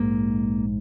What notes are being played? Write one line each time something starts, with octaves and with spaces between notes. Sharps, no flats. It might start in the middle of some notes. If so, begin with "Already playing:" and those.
Already playing: A#1 G#2 A#3